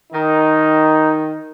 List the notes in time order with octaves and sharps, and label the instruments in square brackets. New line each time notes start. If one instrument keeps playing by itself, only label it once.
[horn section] D#3 [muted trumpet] D#4